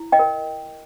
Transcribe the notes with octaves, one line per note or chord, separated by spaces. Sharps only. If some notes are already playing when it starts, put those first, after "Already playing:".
Already playing: E4
D#5 G5
A#4